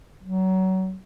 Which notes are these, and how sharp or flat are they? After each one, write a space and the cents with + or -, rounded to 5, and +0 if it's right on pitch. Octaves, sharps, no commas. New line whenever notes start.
F#3 +25